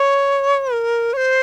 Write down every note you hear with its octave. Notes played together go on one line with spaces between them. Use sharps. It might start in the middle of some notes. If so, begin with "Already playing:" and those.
Already playing: C#5
A#4
C#5
C5